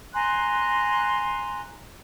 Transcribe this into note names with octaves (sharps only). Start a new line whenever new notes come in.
G#5 A#5 C6 F#6